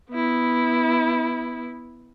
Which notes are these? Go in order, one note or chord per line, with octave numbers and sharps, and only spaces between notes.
B3 E4